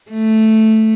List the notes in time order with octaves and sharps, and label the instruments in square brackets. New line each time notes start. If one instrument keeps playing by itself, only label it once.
[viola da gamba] A3